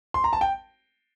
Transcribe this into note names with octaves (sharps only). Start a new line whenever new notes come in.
C6
A#5
A5
G5